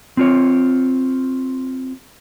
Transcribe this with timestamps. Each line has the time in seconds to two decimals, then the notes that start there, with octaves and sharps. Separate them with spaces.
0.17 C4 F4 C#5